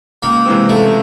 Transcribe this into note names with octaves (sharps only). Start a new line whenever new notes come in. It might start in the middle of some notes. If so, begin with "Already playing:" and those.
C#2 A#3
C3 E3 G#3 C4
C#2 A3